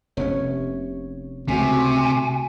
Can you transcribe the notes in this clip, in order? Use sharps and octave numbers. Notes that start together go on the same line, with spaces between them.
F1 C3 B3 C#4 C#5
C#2 C3 A3 F#4 G#5